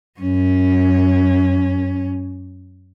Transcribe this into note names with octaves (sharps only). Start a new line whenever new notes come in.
F#2 C#4